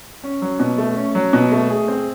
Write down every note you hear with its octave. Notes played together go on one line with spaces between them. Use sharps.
C#4
F#3
B2
A3
C#4
F#3
B2
A3
G#4
C4